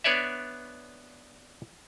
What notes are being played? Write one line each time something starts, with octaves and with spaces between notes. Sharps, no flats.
B3 D4 B4 C#5 D5 E5